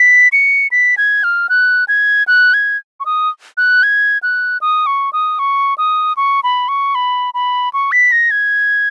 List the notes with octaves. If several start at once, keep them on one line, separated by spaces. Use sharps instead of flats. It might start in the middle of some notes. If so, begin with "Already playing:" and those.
Already playing: B6
C#7
B6
G#6
F6
F#6
G#6
F#6
G#6
C#6
D#6
F#6
G#6
F#6
D#6
C#6
D#6
C#6
D#6
C#6
B5
C#6
B5
B5
C#6
B6
A#6
G#6